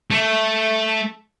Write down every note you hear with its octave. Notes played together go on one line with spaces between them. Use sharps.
A3